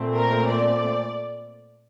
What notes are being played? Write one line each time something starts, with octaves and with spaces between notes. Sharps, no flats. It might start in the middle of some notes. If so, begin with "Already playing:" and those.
Already playing: A#2 A3 C4
A#4
D5